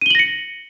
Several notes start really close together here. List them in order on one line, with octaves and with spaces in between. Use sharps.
D#7 G7 F#7 A#6 C#7